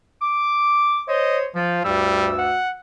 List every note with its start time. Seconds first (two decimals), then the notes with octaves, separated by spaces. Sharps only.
0.22 D6
1.09 C5 C#5 D#5
1.55 F3 F4
1.85 D2 G2 G3 E6
2.39 F#5